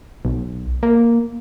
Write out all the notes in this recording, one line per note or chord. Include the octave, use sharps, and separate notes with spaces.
B1
A#3